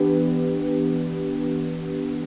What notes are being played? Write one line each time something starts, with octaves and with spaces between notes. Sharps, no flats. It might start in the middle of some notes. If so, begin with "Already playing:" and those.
Already playing: E3 B3 D4 G4 B4